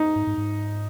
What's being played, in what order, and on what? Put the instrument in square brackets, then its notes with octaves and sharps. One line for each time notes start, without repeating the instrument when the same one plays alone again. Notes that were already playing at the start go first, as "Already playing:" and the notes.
Already playing: [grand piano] D#4
[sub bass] G#2
G#2
G#2